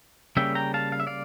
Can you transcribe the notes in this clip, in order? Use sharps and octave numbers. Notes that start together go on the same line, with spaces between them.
C#3 G3 A#3 C#4 E5 G5
G5 A#5
F5 A5
F5
E5
D5 F5